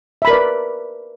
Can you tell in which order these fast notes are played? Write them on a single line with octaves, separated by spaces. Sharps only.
E5 B5 A#4 D5 B4